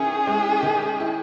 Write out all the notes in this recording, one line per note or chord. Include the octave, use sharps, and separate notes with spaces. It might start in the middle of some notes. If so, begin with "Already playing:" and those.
Already playing: D#3 C#4 E4 G#4
G#3
D#3
E4